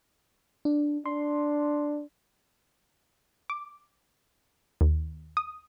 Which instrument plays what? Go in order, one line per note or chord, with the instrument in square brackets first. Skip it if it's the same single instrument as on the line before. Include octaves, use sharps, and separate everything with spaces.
[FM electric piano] D4
[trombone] D4 [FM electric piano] C6
[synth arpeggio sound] D6
D#2
D#6